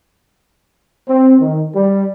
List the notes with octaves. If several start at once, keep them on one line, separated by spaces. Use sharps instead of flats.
C4
D#3
G3